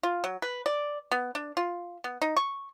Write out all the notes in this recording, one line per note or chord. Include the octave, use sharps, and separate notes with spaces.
F4
F#3
B4
D5
B3
D4
F4
B3
D#4
C#6